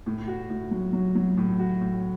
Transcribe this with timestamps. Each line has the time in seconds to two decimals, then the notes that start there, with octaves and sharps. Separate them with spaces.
0.06 A2
0.27 F#4
0.50 A2
0.71 F#3
0.93 F#3
1.15 F#3
1.37 A2
1.59 F#4
1.81 A2